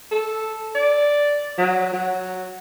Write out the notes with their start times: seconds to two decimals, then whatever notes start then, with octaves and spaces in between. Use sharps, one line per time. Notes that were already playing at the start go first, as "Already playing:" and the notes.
0.12 A4
0.75 D5
1.58 F#3
1.93 F#3